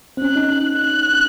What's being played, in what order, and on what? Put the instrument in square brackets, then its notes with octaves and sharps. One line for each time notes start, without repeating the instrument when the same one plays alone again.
[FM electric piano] C4
[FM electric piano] C#4 [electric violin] F#6
[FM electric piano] D#4
D#4
[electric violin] F#6